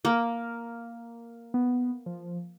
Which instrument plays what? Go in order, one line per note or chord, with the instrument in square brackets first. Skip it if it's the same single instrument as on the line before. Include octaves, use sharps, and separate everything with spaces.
[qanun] A#3
[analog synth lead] B3
F3